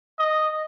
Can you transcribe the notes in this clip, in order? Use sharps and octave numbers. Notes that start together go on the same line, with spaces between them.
D#5